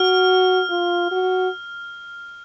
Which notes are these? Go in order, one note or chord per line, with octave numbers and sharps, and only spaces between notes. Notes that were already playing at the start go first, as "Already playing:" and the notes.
Already playing: F#4 F6
F4
F#4